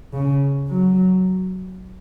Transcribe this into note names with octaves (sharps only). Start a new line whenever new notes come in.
C#3
F#3